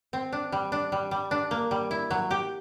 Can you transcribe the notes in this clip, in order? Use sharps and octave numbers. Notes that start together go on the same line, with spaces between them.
C4
D4
G3
D4
G3
G3
D4
A#3
G3
E4
F#3
G4